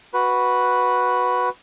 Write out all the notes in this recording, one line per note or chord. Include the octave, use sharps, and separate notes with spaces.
F#4 B4